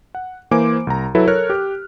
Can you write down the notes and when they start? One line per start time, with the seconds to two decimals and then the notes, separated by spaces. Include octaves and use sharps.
0.15 F#5
0.51 E3 A#3 C5 G#5 D6 D7
0.87 C2 A#5
1.15 F#3 E4 A4 B4
1.27 A4 A#4 C#5 F6 F#6
1.50 G4